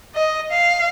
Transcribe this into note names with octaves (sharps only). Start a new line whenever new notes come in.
D#5
F5